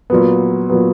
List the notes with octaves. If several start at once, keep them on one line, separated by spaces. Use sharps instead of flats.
A#2 F#3 B3
A#2 F#3 B3